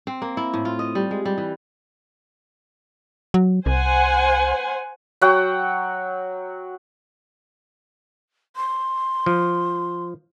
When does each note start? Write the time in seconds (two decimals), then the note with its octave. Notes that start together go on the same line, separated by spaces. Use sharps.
0.07 C4
0.22 A#3
0.37 E4
0.54 A2
0.65 F4
0.79 D#5
0.95 G3
1.11 G#3
1.25 G3
1.38 E3
3.34 F#3
3.66 C2 C5 F#5 G#5
5.21 F#3 F#5 G5
8.56 C6
9.26 F3